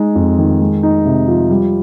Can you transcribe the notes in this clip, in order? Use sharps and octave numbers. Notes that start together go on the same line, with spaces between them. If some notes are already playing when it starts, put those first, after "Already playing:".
Already playing: G#3 D#4
F2
D#3
G#3
D#4
C3
F3
G3